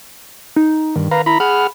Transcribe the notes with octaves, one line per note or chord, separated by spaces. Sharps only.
D#4
G2 D#3
B4 F5 A#5
E4 A#5 B5
G#4 F#5 B5 F6